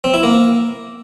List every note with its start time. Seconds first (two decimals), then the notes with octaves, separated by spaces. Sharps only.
0.04 C4
0.14 E4
0.23 A#3